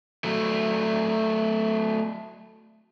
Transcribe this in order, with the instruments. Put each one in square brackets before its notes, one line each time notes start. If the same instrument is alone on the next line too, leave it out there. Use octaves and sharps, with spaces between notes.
[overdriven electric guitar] F#3 A3